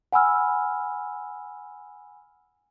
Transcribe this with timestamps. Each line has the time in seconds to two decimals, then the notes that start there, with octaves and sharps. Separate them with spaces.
0.13 F#5 G#5 B5 E6 F6